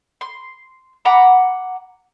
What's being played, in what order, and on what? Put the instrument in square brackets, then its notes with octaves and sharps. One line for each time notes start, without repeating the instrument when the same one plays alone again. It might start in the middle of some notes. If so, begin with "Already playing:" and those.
[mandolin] C6
F#5 A#5 B5 D6